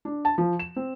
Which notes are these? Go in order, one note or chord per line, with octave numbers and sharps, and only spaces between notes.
D4
A5
F3
E7
C4